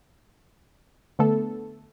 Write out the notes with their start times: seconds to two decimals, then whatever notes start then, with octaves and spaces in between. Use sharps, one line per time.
1.19 D3 A3 B3 A4